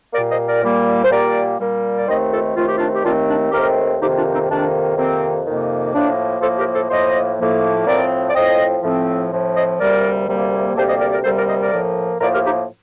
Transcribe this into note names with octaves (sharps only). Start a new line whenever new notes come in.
A#2 G3 A#3 A#4 D5
C5 D#5
A#4 D5
A#2 G3 A#3
C5
A#2 G3 A#3 A#4 D5
A#2 G3 A#3
D5
D#2 D#3 A3 C4 C5 D#5
F4 A4
D#2 D#3 A3 C4 F4
G4
D4 F4
G4
D#2 D#3 A3 C4 D4 F4
D4
D#2 D#3 A3 C4 G4 A#4
F2 C3 D#3 A#3 D#4 G4
D4 F4
C4 D#4
F2 C3 D#3 A#3 D4
F2 C3 D#3 A#3 C4
F2 C3 D#3 A#3
A2 F3 A#3 D4
A2 F3 A#3 A4 C5
G4 A#4
A4 C5
A2 F3 A#3 C5 D#5
A2 F3 A#3
A2 F3 C4 A#4 D5
D5
A2 F3 C4 C5 D#5
A2 F3 C4
A2 F3 C4
C5 D#5
D2 C3 G3 A#3 A#4 D5
D2 C3 G3 A#3
D2 C3 G3 A#3 A4 C5
C5 D#5
A#4 D5
A#4 D5
D2 C3 G3 A#3 A4 C5
A#4 D5
C5 D#5
A#4 D5
A2 F3 A#3
A2 F3 A#3 A#4 D5
G4 A#4
D#4 G4